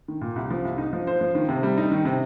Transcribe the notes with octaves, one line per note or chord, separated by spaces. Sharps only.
D#3
A#2
C2
F3
C2
D#4
F3
C5
F3
D#3
C3
G3
D#4
D#3
C3